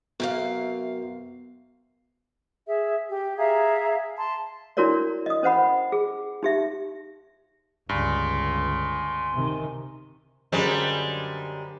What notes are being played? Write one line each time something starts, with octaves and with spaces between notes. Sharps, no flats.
F#2 C3 B3 F5
G#4 E5
G4
G#4 E5 F5 A#5
A5 C6
D4 E4 F#4 A#4 C#5 D5
D#5 D#6
C#4 C5 F#5 B5
G#4
D#4 G4 E5
G1 C#2 G2 G#5 C6
C3 D#3
F#2 D3 G3 G#3 C5